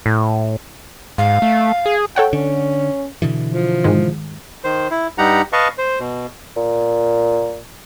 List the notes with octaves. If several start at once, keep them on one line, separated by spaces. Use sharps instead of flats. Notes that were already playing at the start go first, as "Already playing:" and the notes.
A2
G#2 F5
A3
G#4
A4 C#5 F#5 G5
D3 C#4
B2 D3 E3
F3
G#2 D#3 G#3
D#3 C5
E4
G2 G3 D#4 G4 F#5 A#5
B4 D#5 F5 A5 C#6
C5
B2
A#2